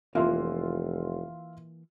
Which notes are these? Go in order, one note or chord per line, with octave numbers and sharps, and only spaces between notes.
F1 E3 A#3 F4 E5 C6